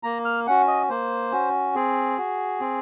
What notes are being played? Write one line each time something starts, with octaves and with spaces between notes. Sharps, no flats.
A#3 A#5
F6
C#4 F#4 F#5
D#5
A#3 C5
C#4 F#4
C4 G#4
F#4
C4